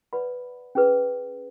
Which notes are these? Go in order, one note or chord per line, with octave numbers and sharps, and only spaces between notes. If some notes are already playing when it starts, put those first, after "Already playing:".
B4 D5 F#5 B5
C#4 G#4 B4